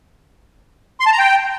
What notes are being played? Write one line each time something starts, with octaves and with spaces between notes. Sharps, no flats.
C6
A5
A#5
G5